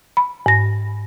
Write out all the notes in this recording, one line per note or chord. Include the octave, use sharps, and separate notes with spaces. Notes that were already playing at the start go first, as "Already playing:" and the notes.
B5
G#2 A#6